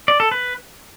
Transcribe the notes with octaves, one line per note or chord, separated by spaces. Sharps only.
D5
A4
B4